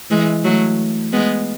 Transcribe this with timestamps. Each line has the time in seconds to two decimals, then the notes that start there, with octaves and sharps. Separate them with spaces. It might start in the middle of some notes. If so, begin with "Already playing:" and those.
0.10 E3 G#3
0.44 F#3 A3
1.12 G#3 B3